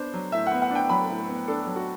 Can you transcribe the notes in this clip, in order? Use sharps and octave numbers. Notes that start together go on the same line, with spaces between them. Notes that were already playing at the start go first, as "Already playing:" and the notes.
Already playing: B3 D4 C5
F#3
A2 E5
F#5
B3
F#5
D4 G5
F#3 B5
A2
B3
D4 A4
F#3
F#4